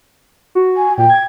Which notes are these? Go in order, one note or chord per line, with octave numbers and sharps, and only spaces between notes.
F#4
G#5
A#2 G5
G#6